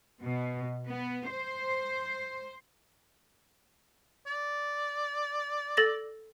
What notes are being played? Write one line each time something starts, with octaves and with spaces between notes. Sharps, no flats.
B2
B3
C5
D5
A4 A6 A#6